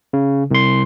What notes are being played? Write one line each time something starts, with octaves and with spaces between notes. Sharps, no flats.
C#3
C2 C6